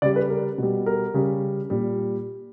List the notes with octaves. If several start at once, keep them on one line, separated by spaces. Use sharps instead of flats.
C#3 G3 D5
B4
A#4
B2 G3
A#4
C#3 G3
A#2 G3